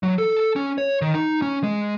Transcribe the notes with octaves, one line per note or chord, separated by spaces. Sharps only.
F#3
A4
C#4
C#5
D#3
D#4
C#4
G#3